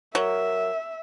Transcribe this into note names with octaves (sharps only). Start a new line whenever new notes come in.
F#3 A#4 E5